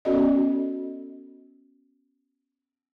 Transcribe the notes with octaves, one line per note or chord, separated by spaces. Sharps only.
B3 C#4 F#4 A4 D5 D#5